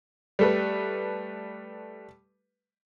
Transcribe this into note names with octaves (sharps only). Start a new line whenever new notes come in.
G3 A3 B4